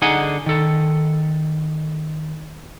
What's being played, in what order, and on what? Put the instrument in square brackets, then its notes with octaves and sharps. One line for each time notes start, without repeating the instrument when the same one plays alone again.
[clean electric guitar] D3 D#4 G#4 D#5 F#5 G#5
D#3 A4